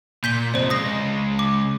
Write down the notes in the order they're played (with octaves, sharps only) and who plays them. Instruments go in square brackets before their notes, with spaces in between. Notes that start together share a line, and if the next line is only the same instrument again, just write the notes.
[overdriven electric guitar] A#2 [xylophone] G6 B6 G7
[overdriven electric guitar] F2 C3 [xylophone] C5 D5
[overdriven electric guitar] C#3 G#3 [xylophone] D#6 A#6
[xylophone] D6